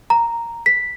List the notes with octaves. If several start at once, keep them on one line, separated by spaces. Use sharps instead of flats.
A#5
B6